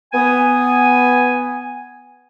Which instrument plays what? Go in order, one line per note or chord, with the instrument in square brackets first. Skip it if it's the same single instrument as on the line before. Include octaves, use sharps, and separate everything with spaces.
[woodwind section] B3 G#5